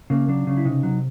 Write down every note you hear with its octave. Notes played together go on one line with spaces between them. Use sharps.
C#3 A#3
F#3 D4
C#3
E4
C3 D#4
F#3